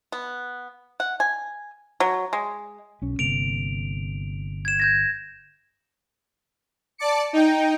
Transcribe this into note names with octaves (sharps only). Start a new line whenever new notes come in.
B3
F#5
G#5
F#3
G#3
B1 C#4
G1 C3 A#3 D7 F7
G#6 E7
G6 G#6 A#6
D5 A5 D6 C#7
D#4 G5